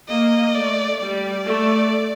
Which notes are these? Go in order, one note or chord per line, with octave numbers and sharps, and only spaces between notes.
A#3 D#5
A3 D5
G3 D5
A3